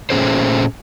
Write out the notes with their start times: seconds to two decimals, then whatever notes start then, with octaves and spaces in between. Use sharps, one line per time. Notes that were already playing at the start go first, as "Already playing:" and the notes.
0.10 A#2 G3 A3 C#4 G#4 C5